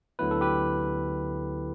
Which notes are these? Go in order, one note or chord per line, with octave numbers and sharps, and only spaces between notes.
D2 D3 F#3 B3 E4 B4
A4
G4 B4